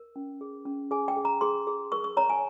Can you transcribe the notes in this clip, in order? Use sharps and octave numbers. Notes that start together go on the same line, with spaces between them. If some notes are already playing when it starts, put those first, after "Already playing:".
Already playing: A#4
C#4
G#4
C#4
G#4 G#5
G5
G#4
A#5
G#4 C6
G#4
A#4 C#6
C#6
C#5 A#5
G#5